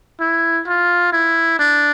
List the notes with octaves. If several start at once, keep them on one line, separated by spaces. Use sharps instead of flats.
E4
F4
E4
D4